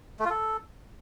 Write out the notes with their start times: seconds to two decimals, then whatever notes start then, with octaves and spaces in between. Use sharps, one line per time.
0.20 A3
0.25 F4
0.30 A4